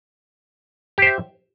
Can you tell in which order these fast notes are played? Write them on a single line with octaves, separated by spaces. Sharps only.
G4 C5 E5